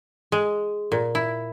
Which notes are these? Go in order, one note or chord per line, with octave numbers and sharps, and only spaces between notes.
G#3
A#2
E4